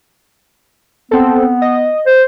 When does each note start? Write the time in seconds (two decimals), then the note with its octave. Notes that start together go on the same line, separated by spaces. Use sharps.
1.11 B3 C4 A4
1.62 D#5
2.06 C5